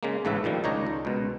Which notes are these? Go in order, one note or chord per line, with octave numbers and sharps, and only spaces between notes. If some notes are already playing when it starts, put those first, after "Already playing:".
C#3 G#3 A#3
A1 G#2 C#3 A3 B4 E5
A#2 D#3 F3 G3
C#2 D#3 D4 D#4 C#5 A#5
C#2
C#2 B2